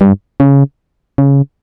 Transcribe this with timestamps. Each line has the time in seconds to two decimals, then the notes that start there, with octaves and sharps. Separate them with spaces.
0.01 G2
0.40 C#3
1.18 C#3